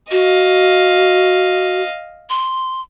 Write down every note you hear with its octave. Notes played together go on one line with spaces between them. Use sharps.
F#4 D#5 F5
C6